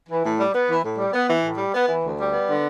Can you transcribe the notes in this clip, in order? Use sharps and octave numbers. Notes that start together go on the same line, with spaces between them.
E3
A2
G3
B3
E3
A2
G3
B3
E3
A2
G3
B3
E3
D2
G3
B3
D3